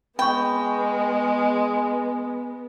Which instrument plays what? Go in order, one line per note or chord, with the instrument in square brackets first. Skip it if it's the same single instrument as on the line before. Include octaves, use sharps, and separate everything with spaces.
[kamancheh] G#3 [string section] B3 [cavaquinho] G5 [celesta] B5 C#6